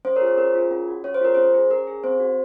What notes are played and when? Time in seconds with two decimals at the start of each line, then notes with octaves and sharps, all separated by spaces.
0.05 C#4 C5
0.16 A#4 C#5
0.21 F4 G#4
0.27 C5
0.37 C#4 A#4
0.55 F4 G#4
0.71 C#4
0.88 F#4
1.04 C#4 C#5
1.14 C5
1.21 F4 G#4 A#4
1.34 C#4 C5
1.54 G#4
1.70 C#4 A#4
1.87 G#4
2.04 C4 C5
2.20 F#4